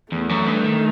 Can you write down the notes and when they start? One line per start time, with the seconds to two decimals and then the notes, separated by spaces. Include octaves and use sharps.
0.12 E2 A3
0.29 F#2
0.46 G2
0.64 D#3